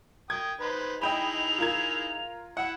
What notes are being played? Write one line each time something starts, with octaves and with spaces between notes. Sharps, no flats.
G5 D#6 G#6
D#4 B4 C5
D#4 E4 G#4 D#5 G5 B5 F7
F4 A#4 G#6
E4 F#5 C#7